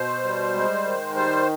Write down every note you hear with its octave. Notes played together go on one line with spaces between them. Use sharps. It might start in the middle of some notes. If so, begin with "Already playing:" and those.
Already playing: B2 C5
G3
G#3
D#3
G3 C5